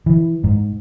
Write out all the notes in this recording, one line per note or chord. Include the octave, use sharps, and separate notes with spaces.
E3
G#2